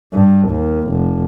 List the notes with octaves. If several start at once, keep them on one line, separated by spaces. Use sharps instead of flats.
G2
D#2
F1